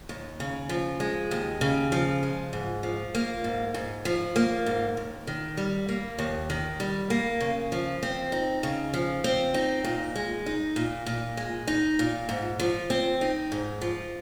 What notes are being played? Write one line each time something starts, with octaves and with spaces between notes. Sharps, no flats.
D#2
C#3
F3
G#3
D#2
C#3
F3
G#3
G#2
F3
A#3
G#2
G#2
F3
A#3
G#2
D#2
D#3
G3
A#3
D#2
D#3
G3
A#3
C#3
F3
C4
D#4
C#3
F3
C4
D#4
A#2
G#3
D#4
A#2
A#2
G#3
D#4
A#2
G#2
F3
C4
D#4
G#2
F3